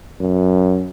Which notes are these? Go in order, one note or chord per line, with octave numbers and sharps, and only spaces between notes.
F#2